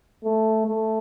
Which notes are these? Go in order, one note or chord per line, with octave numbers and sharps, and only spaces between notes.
A3
A3